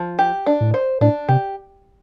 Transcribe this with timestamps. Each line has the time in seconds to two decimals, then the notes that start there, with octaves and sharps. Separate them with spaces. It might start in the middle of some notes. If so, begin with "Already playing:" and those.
Already playing: F3
0.19 G4
0.46 D4
0.60 A2
0.74 C5
1.01 A2 D4
1.29 C3 G4